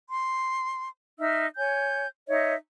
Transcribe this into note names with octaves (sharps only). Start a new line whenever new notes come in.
C6
D#4 E5 E6 F6
C#5 G#5 G6
D#4 C#5 D#5 E5